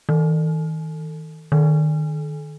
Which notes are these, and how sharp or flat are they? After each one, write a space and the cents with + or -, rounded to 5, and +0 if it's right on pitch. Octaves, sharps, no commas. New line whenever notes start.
D#3 +35
D#3 -25